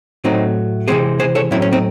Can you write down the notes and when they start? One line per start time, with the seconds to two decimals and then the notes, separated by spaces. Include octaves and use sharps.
0.24 A2 F#3 A3 C4 D#4
0.88 C3 E3 G#3 C4 G#4 C5
1.20 G#4 C5
1.35 A4 C#5
1.51 A2 F#3 A3 C4 C#4 E4
1.62 C#4
1.73 C4 D#4